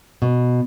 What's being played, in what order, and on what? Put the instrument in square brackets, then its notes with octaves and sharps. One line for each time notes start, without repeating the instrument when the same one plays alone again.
[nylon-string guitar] B2